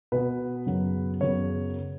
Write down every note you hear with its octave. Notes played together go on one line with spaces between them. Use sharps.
B2 B3 B4
F#2 C#3 F#3 B3
F#2 C#3 F#3 B3 C#5